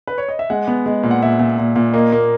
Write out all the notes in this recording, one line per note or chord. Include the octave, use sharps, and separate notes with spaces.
B4
C#5
D#5
E5
G#3 F#5
B3
G#3
A#2
F#5
A#2 E5
A#2
A#2
A#2
A#3 D#5
A#3